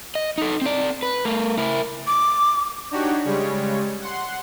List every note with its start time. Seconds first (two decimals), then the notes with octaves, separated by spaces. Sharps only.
0.15 D#5
0.38 D#4 A4
0.62 C4 D5
1.03 B4
1.25 A3 A#4
1.58 E4 A#4
2.07 D6
2.91 D4 D#4 F#4 G4 C#5
3.25 C#3 G3 G#3 C#5
4.01 F#5 C6